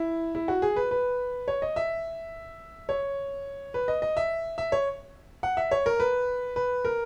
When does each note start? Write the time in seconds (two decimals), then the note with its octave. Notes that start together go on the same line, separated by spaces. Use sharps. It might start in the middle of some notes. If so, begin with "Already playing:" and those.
Already playing: E4
0.35 E4
0.48 F#4
0.62 G#4
0.76 B4
0.91 B4
1.48 C#5
1.62 D#5
1.76 E5
2.89 C#5
3.74 B4
3.88 D#5
4.02 D#5
4.17 E5
4.58 E5
4.72 C#5
5.43 F#5
5.57 E5
5.71 C#5
5.86 A#4
6.00 B4
6.56 B4
6.85 A#4